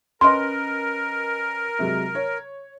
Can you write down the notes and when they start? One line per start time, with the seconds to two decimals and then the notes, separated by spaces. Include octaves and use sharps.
0.21 C#4 A#4 B4 D#5 C6
1.79 C3 F#3 G#3
2.15 C#5